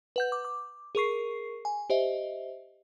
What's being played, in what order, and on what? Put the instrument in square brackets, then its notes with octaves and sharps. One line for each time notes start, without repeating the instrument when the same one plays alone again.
[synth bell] B4 F#5 G6
D6
D6
G#4 A#4 C#6 C7
G#5
G4 C5 D#5 E5